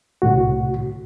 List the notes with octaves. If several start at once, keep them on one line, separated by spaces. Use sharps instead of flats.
C2 A2 F#4